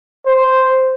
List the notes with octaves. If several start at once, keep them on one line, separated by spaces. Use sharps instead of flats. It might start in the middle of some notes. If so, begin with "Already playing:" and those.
C5